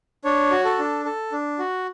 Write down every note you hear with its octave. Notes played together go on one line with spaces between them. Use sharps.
D4 C#5
F#4
A4
D4
A4
D4
F#4